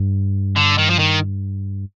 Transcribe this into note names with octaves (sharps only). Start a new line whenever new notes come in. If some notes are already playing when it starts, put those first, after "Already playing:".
Already playing: G2
D3
D#3
F3
D#3